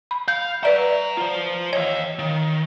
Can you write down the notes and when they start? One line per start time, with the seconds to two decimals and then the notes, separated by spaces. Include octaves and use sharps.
0.11 B5
0.28 F5 G6
0.63 B4 D5 E5 F#5 A#5
1.17 F4 C5
1.73 E3 C#5 D#5 F5
2.19 D#3